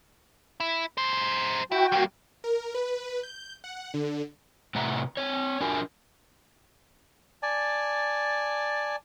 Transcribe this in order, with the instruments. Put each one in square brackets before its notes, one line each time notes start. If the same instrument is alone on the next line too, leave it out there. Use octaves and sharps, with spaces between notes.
[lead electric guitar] E4
F#2 C5
[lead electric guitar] E4 [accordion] F#4 G5
[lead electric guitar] G3 A#3
[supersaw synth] A#4
B4
G6
F#5
D3
[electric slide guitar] A2 C3 B4 E5 F#5 A#5
C4 C#5
D4 F4 F#4 A#4 G#5
[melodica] D5 G#5 A5